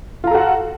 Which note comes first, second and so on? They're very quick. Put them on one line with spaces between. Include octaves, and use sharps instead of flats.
F4 A#5 A4 F#4 F#5